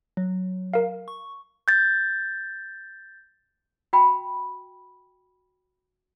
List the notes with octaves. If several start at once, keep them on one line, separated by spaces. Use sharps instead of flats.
F#3
A#4 F5
C#6
G6 A6
F#4 G5 B5